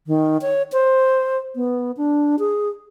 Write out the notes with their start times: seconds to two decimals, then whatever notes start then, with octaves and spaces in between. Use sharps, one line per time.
0.07 D#3
0.42 C#5
0.72 C5
1.55 B3
1.97 D4
2.39 G#4